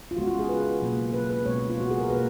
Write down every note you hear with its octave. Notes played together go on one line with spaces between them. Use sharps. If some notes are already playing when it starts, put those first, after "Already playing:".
F4
C#3 G#3 B3 F#4
F4
G#4
B4
B2 F#3 A#3
B4
B4
B2 G#3 B3 C#5
F4
F#4
G#4
A#4
B2 A#3 B4